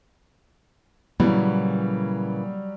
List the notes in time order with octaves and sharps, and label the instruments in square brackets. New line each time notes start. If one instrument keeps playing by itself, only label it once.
[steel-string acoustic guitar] A#2 C#3 E3 [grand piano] F#3 G3